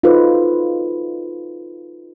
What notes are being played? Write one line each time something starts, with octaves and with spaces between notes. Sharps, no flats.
D#4 F4 F#4 A4 B4 C5